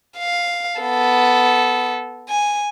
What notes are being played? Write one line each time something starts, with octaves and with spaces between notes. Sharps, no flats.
F5
B3 A4
G#5